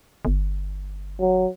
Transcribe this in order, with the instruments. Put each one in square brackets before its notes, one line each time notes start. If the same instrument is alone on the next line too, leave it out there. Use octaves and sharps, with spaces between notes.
[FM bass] G1
[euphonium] F#3